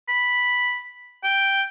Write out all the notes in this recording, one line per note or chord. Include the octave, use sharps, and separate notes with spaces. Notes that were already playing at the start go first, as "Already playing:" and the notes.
B5
G5